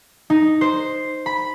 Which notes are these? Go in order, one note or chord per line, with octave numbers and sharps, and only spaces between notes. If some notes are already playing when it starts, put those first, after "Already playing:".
D#4
C5
B5